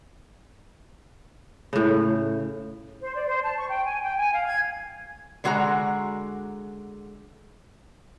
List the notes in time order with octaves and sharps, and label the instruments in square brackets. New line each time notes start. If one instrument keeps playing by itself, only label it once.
[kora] A2 C#3
[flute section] C5
D5
C5
A5
C#6
G5
G#5
G5
G#5
F5
G#6
[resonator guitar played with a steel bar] D3 G#3 F#4 C#5 A#5